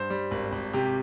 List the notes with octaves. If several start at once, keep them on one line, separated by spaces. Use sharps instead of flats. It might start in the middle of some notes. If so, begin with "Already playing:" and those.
Already playing: G2 C5
G3
G#1
G#1
C3 G4